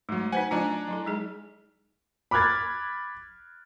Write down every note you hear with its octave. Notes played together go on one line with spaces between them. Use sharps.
G#2 F#3 A3
D#4 B4 C5 F#5 G#5
F#3 A3 D4 F4 G#5 A#5
F#3 E4 A4
G#3 D#4 G#4
B5 D6 F6 F#6 G#6 A6